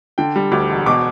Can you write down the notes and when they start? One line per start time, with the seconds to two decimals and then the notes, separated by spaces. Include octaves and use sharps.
0.18 D3 G5
0.36 G3
0.52 D2 D6
0.70 E1
0.86 B2 D6